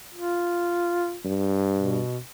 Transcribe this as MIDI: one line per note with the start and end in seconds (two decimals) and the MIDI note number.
0.14 1.17 65
1.25 2.01 43
1.76 2.19 47